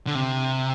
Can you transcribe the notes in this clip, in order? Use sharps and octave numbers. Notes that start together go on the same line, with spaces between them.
D3
C3